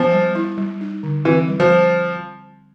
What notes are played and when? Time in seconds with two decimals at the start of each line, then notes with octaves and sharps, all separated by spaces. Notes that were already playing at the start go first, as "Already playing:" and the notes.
Already playing: F3 B3
0.13 G3
0.35 E4
0.57 G3
0.81 D#4
1.03 D3
1.25 E3 C4
1.48 G3
1.60 F3